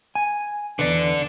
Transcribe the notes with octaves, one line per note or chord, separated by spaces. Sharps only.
G#5
E2 D3 B4 D5